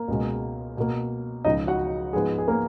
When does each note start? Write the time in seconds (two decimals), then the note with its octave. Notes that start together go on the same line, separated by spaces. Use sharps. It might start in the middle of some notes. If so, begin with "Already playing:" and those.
Already playing: A#3 A#4
0.08 C#2 B2 G#3
0.77 B2 A#3
1.45 C#2 C#3 F3 D#4 D#5
1.67 F#4 F#5
2.13 G#2 F3 G#3 B3 G#4
2.38 G#4
2.48 A#3 A#4